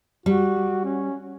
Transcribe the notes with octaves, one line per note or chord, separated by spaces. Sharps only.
G3 F#4
C#4